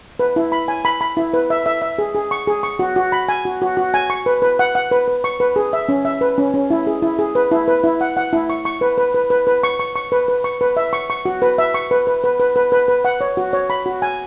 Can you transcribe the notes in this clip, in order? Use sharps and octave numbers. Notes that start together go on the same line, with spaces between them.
B4
E4
B5
G#5
B5
B5
E4
B4
E5
E5
E5
G#4
G#4
C#6
G#4
C#6
F#4
F#4
B5
G#5
F#4
F#4
F#4
G#5
C#6
B4
B4
F#5
F#5
B4
B4
C#6
B4
G#4
E5
C#4
E5
B4
C#4
C#4
E4
G#4
E4
G#4
B4
E4
B4
E4
F#5
F#5
E4
C#6
C#6
B4
B4
B4
B4
B4
C#6
C#6
C#6
B4
B4
C#6
B4
E5
C#6
C#6
F#4
B4
E5
C#6
B4
B4
B4
B4
B4
B4
B4
F#5
C#5
F#4
C#5
B5
F#4
G#5